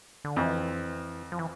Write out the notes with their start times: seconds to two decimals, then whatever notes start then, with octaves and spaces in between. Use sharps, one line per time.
0.25 D3
0.36 F2 E3
1.32 F3
1.39 E3